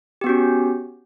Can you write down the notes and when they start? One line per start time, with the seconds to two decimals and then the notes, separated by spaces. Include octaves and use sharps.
0.21 G4
0.24 B3
0.27 F#4
0.29 C#4